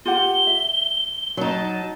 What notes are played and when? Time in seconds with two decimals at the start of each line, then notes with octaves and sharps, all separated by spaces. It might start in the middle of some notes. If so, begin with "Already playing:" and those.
0.06 F4 G4 F#5 G7
0.47 E5
1.37 F#3 D#4 A5